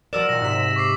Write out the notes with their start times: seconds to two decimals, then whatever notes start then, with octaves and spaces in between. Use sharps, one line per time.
0.13 F3 F#3 A#4 D5 E6 E7
0.29 A#2 D#3 A#6
0.41 G#2 C3 B6
0.76 C#6 D6 C7